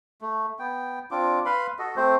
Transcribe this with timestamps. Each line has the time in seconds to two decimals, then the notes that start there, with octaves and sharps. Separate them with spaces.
0.21 A3
0.59 B3 G5
1.11 C4 D4 F4 D6
1.45 B4 F5 B5 C6
1.79 F#4 A4 D#5
1.96 A3 C4 C5